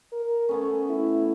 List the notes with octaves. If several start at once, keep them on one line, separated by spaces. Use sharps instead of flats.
A#4
A3 B3 C#4 A4
E4